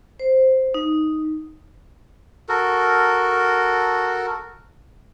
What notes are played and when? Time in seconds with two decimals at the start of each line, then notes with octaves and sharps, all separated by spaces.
0.20 C5
0.74 D#4
2.49 F#4 A4 A#4